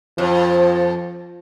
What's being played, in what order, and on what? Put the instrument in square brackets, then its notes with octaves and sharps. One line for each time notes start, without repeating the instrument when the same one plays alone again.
[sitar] F2 [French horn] F3